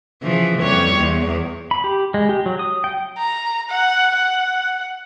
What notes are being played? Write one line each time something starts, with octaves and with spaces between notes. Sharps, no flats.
C#3 E3 F3
F2 G3 C#5
E2
B5
G4
G#3
G4
F#3
D#6
G5
A#5
F#5
F#5